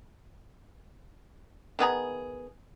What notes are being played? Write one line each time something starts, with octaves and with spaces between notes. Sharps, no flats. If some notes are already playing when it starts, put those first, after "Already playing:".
D#3 B3 G#4 A#5